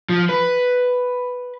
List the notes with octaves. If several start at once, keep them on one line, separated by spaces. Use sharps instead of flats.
F3
B4